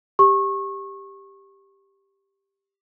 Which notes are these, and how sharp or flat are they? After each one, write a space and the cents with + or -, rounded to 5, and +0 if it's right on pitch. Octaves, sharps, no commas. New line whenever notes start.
G4 +5 C#6 -25